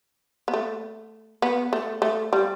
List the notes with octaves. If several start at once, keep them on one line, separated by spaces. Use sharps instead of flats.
B3
A3
B3
A3
A3
G3